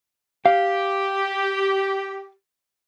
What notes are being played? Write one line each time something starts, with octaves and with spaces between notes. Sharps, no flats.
G4 F5